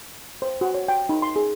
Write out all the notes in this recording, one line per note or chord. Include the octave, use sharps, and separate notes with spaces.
C5
F#4
C#5
G5
D#4
C6
G#4